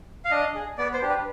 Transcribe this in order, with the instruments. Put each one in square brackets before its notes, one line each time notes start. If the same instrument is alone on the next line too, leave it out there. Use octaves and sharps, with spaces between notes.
[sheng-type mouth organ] F5
D4 D#5
G#4
B3 D5
C5
D4 G4
B4